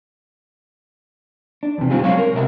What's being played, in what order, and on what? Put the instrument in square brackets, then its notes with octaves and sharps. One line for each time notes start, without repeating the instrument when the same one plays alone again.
[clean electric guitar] D4
E2 C3
B2 D3 G3 C4 F4 G#4
F#3 G#3 C4 C#5 F5
A#4
C#2 C3 A#4 D#5 E5